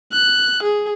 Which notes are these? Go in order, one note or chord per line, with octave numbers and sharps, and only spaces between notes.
F#6
G#4